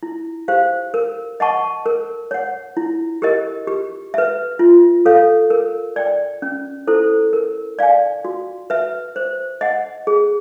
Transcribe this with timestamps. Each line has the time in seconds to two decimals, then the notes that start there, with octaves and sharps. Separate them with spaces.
0.03 E4
0.48 G4 C5 F5
0.94 A#4
1.40 D#5 F#5 A5 C#6
1.86 A#4
2.31 C#5 F#5
2.77 E4
3.22 G4 A#4 D#5
3.68 G4
4.14 B4 E5
4.59 F4
5.05 A4 C#5 F5
5.50 A#4
5.96 D5 G5
6.42 C#4
6.87 E4 A4 C5
7.33 A#4
7.79 D5 F5 G#5
8.25 F#4
8.70 B4 E5
9.16 C5
9.61 D#5 F#5
10.07 G#4